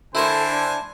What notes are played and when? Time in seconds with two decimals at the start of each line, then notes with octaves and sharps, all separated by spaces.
0.15 D3 E4 A4 A#4 C5 G#5 C#6
0.52 D4